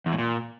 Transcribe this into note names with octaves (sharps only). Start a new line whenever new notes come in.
E2
A2
A#2